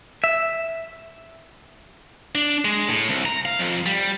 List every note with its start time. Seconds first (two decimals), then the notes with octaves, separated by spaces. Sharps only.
0.24 E5
2.35 D4
2.65 G#3
2.90 A2
3.09 C2
3.26 A#5
3.45 F5
3.59 F2
3.86 G3